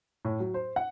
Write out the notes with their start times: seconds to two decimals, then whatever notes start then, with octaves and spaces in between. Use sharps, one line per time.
0.25 A2
0.40 F#3
0.54 C5
0.76 F#5